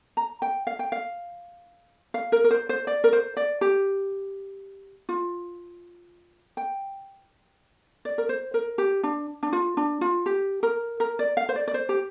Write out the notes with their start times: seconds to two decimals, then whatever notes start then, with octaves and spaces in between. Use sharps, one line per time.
0.17 A#5
0.42 G5
0.67 F5
0.79 G5
0.92 F5
2.14 F5
2.32 A#4
2.44 A#4
2.51 C5
2.69 C5
2.87 D5
3.04 A#4
3.13 C5
3.37 D5
3.61 G4
5.09 F4
6.57 G5
8.05 D5
8.18 A#4
8.29 C5
8.54 A#4
8.78 G4
9.03 D4
9.43 D4
9.53 F4
9.77 D4
10.01 F4
10.26 G4
10.63 A#4
11.00 A#4
11.19 D5
11.37 F5
11.49 C5
11.56 D5
11.68 D5
11.74 C5
11.89 G4